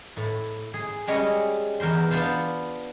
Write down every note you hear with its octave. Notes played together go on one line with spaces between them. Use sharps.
A2
G#4
G3 G#3 C#4 C#5 D#5
E2 A#4 C5 C6
B3 D4 F4 C5 F5